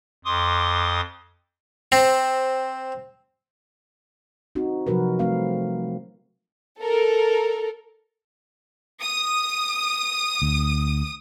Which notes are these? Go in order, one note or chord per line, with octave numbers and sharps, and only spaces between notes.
F2 C6 D6 D#6
C4
C4 D#4 F#4
C3 F3 F#3 F#4 A#4 B4
G3 A3 C4 A#4 F5
A4 A#4
D#6
D2